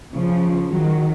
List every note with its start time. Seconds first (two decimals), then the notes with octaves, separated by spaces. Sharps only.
0.13 C#3 F3
0.69 D#3 F#3